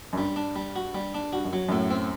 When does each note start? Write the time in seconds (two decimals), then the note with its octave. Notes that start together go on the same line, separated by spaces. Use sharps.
0.13 F#2
0.17 G2 G3
0.36 D4
0.56 G3
0.76 F#4
0.95 G3
1.14 D4
1.33 G2 F#4
1.45 F#2
1.53 F#3
1.68 F#2 A2
1.91 C4